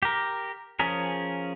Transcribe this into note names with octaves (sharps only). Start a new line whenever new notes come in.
G4 A#4
F3 C#4 G#4 A#4